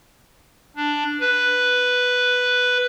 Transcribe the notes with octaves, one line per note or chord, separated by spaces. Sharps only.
D4
B4